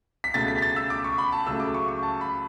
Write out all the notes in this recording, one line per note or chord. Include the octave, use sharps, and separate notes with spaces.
B6
C#2 B2 A3 A6
B6
A6
E6
D6
C#6
B5
A5
C#2 C#3 F#3 A3 E6
D6
C#6
C#6
A5
B5